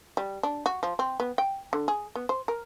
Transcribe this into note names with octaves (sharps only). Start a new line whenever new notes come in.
G3
D4
F#4
F3
C4
B3
G5
D3
G#4
B3
C5
A#4